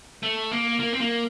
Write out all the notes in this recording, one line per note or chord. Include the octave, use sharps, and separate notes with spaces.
A3
A#3
A#3
C4
A#3